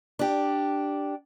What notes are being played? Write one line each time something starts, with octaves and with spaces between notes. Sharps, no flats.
D4 G4